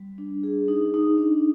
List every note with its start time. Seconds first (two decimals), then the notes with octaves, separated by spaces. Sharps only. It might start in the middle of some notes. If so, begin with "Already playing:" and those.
Already playing: G3
0.18 D4
0.43 G#4
0.68 D#4
0.94 D#4
1.18 D4